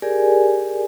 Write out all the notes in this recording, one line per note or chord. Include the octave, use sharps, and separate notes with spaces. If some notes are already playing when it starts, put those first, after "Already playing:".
G4 G#4 A#4 D5 G#5